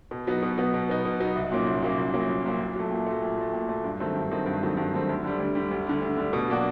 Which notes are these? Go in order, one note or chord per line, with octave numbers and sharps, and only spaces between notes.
B2
F#3 B3 D#4
B2
F#3 B3 D#4
B2
F#3 B3 D#4
B2
F#3 B3 D#4
C2
A#2 F#3 A#3 C#4
C2
A#2 F#3 A#3 C#4
C2
A#2 F#3 A#3 C#4
C2
A#2 F#3 A#3 C#4
A#2
F#3 A3
A#2
F#3 A3
A#2
F#3 A3
A#2
F#3 A3
G2
D#3 F#3 A3 C4
G2
D#3 F#3 A3 C4
G2
D#3 F#3 A3 C4
G2
D#3 F#3 A3 C4
D2
D3 G3
D2
D3 G3
D2
D3 G3
D2
D3 G3
B2
F#3 A#3 D4 F#4